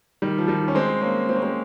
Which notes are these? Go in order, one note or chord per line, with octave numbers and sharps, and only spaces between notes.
D#3 G3
F3
D#3 G3
C#4
G#3 C4
A#3 C#4
C4
C#4
G#3 C4